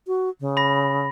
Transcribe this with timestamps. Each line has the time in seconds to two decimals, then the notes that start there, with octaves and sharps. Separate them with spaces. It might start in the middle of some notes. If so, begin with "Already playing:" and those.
0.07 F#4
0.40 C#3
0.57 B5 A#6